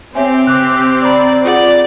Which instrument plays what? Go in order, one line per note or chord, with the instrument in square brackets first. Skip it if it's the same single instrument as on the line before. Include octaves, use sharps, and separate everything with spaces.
[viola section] C4 [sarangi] G4 [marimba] C#5 E5 G#5
[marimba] C#3 [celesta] D6 F#6
[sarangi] D5 [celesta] A#5 B5 D6
[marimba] F4 G#4 F#5 [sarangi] D5